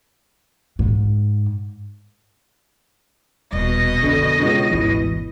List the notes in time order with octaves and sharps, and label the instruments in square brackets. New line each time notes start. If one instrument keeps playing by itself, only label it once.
[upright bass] G#2
[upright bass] D#1 [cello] B2 D#5
[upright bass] F2 D#3 [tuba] D3
[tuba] C#2
[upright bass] G#1 D2 [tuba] E3